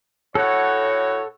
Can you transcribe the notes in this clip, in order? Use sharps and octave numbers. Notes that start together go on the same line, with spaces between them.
A2 F#4 A4 C#5 F#5